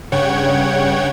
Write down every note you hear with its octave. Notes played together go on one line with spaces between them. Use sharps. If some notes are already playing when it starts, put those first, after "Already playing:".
G2 C#3 C#5 F#5 G5 G#6